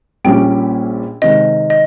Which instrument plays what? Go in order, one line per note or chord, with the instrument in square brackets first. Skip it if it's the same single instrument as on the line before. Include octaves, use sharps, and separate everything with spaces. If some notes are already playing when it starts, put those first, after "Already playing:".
[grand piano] A#1 A#2 G3 C#4 [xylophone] G5
[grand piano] C3 D#3 G#3 [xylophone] D#5
[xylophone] D#5